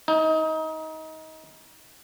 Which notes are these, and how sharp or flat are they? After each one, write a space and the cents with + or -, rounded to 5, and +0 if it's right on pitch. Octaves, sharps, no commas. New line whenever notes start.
D#4 +25